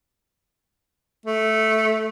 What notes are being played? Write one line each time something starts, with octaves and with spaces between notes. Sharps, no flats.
A3